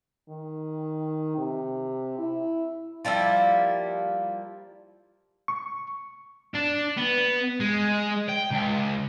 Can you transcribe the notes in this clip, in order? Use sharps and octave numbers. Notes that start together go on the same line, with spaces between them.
D#3
C3
E4
F3 G3 A#3 E4
C#6
D4
B3
G#3
G5
C#2